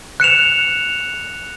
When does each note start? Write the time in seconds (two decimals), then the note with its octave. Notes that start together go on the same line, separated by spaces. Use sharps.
0.20 F#6 C#7 E7 F7